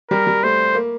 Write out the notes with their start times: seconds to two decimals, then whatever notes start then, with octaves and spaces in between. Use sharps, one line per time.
0.11 G3 A#4
0.27 G3
0.43 A3 C5
0.75 A#3